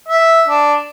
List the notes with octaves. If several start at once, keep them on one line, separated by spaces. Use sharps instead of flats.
E5
D4